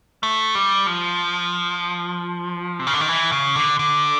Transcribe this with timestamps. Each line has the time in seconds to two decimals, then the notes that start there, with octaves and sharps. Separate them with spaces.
0.23 A3
0.55 G3
0.87 F3
2.79 C3
2.87 C#3
2.93 D3
3.01 D#3
3.08 E3
3.32 C#3
3.55 D3
3.79 D3